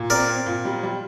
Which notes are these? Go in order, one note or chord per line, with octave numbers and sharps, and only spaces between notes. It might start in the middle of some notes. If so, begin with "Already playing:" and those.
Already playing: A#2
C4 A#4 D5
C4
A#2
G3
G3